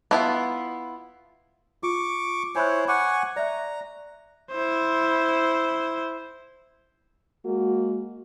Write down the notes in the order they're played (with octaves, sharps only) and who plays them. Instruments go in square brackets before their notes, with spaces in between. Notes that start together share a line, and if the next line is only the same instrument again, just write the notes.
[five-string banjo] B3 E4 F4
[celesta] F4 [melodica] C#6 D6
[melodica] E4 C5 C#5 [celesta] G#5 C#6 F#6
[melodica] F#5 G#5 C#6 [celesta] D6
[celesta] D5 E5 F#6 [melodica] A#5
[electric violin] E4 C5
[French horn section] G#3 A#3 F#4